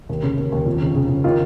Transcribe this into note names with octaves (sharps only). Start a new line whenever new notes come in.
D#2
C#3
D#2
D#2
F2
C#3
C#3
C#3
D#3 F4